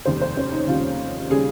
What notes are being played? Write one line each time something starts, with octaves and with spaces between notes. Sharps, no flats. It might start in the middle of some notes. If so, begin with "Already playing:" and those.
F1 D#2 C#3 G3 C5
C5
C#4
D#4
F1 D#2 C#3 G3 F4
C#3 G3 G#4